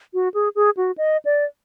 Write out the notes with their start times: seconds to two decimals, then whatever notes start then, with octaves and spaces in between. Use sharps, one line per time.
0.14 F#4
0.34 G#4
0.56 G#4
0.77 F#4
0.98 D#5
1.25 D5